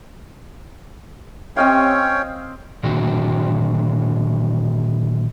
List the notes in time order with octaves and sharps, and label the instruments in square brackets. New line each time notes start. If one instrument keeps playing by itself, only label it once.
[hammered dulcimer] C4 D#5 F5 [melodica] C#4 C#5 G5
[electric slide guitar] A#2 D3 D#3 F#3 C4 F#4